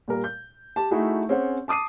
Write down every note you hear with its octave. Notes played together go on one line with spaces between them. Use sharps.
A#2 G3 A#4
G6
G4 A5
A3 D#4 E4 F#4 G#4
C4 C#4 G#4 C5 C#5 F#5
A5 D6 D#6 C7 D#7